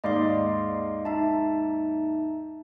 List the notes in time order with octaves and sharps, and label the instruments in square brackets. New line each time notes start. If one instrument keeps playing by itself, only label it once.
[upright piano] D#2 G#2 D5 [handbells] D#5 F5 C6
[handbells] D#4 E5 A5